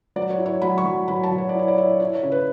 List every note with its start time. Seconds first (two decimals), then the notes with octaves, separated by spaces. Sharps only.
0.16 F#3 D5
0.30 C#5
0.38 E4
0.46 C#5
0.62 F#3 B5
0.78 C#6
0.84 F#3
1.08 F#3 B5
1.23 A5
1.32 F#3
1.38 C#5
1.49 D5
1.55 E4 C#5
1.68 D5
1.77 E4 C#5
2.00 E4 C#5
2.15 C#5
2.23 C#3
2.32 B4